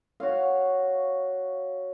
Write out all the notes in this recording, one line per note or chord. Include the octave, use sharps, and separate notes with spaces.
F#4 C#5 F5